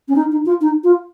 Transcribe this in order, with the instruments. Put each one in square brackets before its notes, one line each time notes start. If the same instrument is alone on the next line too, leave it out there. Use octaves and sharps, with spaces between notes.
[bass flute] C#4
D#4
D#4
F4
D#4
F4